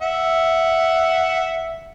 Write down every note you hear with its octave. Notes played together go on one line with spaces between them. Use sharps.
E5 F#5